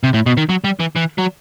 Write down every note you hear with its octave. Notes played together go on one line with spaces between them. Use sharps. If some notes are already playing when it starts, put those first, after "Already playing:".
C3
A2
B2
D#3
F#3
G3
E3
E3
F#3